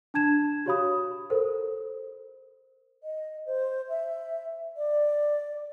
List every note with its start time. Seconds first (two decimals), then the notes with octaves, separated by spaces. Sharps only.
0.14 D4 A5 G#6 E7
0.66 F#4 G4 C#5 F5 B5 D#6
1.30 A4 A#4 C5
3.03 D#5
3.46 C5
3.88 E5
4.77 D5